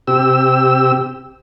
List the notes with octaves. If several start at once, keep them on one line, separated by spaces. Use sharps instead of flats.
C3 G4 E6